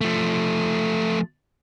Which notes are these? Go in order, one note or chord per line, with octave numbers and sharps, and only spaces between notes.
F3 A3